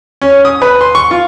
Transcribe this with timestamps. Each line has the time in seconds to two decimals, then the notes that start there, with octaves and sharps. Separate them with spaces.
0.22 C#4
0.45 D#6
0.62 B4
0.81 C6
0.95 C#6
1.11 F4